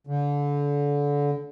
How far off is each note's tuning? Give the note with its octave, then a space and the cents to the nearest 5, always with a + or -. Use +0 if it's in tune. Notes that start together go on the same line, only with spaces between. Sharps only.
D3 -30